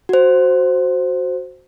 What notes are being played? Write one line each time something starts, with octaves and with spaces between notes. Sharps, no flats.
F#4 C5